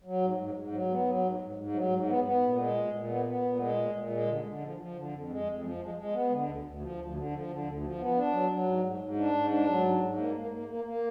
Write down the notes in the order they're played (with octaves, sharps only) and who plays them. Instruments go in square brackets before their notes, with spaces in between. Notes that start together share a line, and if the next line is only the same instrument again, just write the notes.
[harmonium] F#3
G#2
G#2
G#2
F#3
B3
F#3
G#2
G#2
G#2
F#3
G#2
B3
B3
A#2
G#3
A#2
A#2
B3
B3
A#2
G#3
A#2
A#2
G#3
D3
D3
F3
F3
D3
F2
G#3
F2
F3
G#3
G#3
B3
D3
D2
D2
F3
D2
D3
F3
D3
D2
F3
B3
D4
F#3
F#3
G#2
G#2
G#2
D4
G#2
D4
F#3
G#2
G#2
A#3
A#3
A#3
A#3
A#3